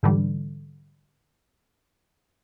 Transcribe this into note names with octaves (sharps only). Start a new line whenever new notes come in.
G#2 D3 E3 G3